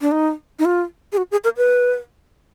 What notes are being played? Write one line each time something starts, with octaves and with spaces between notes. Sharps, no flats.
D4
D#4
D#4
F4
G#4
F#4
G#4
A#4
B4